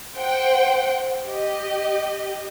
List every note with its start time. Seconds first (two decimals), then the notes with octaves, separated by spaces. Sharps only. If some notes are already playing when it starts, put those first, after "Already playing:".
0.17 C5 F#5 G5
1.25 G4 D#5